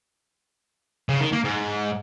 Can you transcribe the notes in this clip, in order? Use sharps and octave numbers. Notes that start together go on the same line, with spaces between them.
C#3
D#3
A#3
G#2